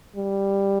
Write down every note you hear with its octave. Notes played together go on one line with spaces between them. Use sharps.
G3